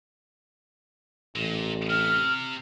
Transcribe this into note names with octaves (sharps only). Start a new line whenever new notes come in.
A1 A#2
C3 F6